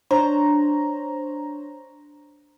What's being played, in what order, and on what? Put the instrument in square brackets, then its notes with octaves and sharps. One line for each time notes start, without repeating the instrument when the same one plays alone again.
[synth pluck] D4 C5 C#5 A#5